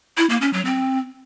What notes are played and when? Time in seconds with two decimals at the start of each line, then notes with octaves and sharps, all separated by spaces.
0.18 E4
0.30 A#3
0.41 C#4
0.53 F#3
0.65 C4